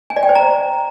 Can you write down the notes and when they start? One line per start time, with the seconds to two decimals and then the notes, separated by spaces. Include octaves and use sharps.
0.10 G#5
0.16 D5
0.23 G5
0.29 C5
0.35 A#5